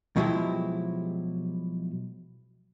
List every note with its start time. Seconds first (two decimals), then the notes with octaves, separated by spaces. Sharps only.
0.16 B2 F3 F#3 G#3 E4 G4